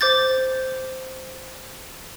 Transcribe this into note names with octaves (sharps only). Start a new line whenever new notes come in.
C5 D6 G6 A6